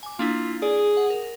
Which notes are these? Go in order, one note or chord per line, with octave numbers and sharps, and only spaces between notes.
G#5 D6
A#3 D4 E4 F4
G#4 D5
F#5
A#4